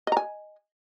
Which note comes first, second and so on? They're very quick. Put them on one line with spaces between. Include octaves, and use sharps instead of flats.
D#5 A#5 G#5